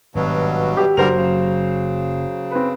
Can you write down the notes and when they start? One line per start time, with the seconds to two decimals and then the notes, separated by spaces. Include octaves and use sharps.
0.15 G#1 G2 B2 F#3
0.77 G4
0.97 F#1 D3 F#3 G3 A#4 C5 F7
1.16 C#3
2.51 C4 B4